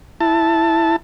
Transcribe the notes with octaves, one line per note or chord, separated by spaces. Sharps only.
E4 A5